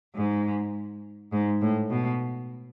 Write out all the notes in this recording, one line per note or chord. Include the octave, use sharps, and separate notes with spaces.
G#2
G#2
A2
B2